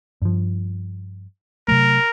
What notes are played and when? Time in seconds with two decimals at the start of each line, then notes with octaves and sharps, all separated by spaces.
0.22 G2 F3
1.68 C3 F#3 A3 A#4